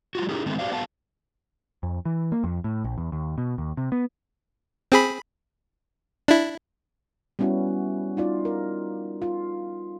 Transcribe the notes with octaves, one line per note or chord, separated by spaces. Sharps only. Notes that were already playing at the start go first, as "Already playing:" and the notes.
G3 F4 F#4
C#4 D#4 E4 G4 G#4 A#4
D3 D#3 G#3 A3 B3 C4
F#4 G4 C5 D5 F5
B3 F#4 A#4 F5 A5
F2
E3
A#3
F2
A2
A#1
E2
D#2
B2
D#2
C3
B3
C4 G#4 B5
D4 E4
G3 B3 C#4 E4 F#4
D#4 F4 D5
A#4
F4